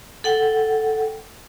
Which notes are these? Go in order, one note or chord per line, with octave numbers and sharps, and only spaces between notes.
A4 F#5 G5